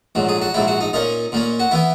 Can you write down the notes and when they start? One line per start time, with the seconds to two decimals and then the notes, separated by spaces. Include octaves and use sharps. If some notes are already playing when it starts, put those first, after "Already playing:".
0.15 A#1 G#2 F#3
0.29 G#4
0.41 F#4
0.54 A#1 G#2 F#3 E4
0.68 F#4
0.80 D#4
0.93 A#2 A#3 C#4 D#4
1.32 A#2 A#3 C#4
1.60 F#4
1.71 E3 B3 E4